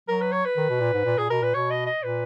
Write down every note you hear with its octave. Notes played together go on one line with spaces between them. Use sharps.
F#3 A#4
B4
C#5
B4
D#3
B2
A#2
G#2
A#2
A#2 G#4
B2 A#4
A#2 B4
B2 C#5
D#5
D#5
A#2 B4